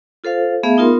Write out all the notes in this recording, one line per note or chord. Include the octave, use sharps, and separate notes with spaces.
F4 A4 C5 F5
A3 B3 G#4 E5 F5
B3 D#4 F4 A#4 C6